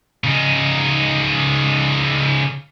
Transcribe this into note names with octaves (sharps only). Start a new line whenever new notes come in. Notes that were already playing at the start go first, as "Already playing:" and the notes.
C#3 D#4